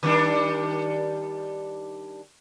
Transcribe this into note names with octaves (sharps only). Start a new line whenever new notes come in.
D#3 G3 D4